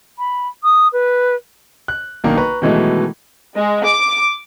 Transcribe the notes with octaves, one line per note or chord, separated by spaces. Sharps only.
B5
D#6
B4
F#6
B1 D#3 A#3 D4 D#4
B4 A#5 C#6
B2 D#3 E3 F#3 G#3 A3
G#3
D6